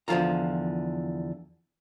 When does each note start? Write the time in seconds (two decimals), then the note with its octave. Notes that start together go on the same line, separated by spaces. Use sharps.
0.08 E2 D3 F3 F4 A#5